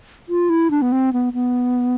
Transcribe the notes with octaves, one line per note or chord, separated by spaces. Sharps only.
F4
E4
D4
B3
C4
B3
B3